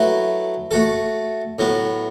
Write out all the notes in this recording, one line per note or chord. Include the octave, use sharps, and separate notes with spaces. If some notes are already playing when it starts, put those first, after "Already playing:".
Already playing: F#3 A3 E4 B4
A3 F#4 A4
A2 F#3 B3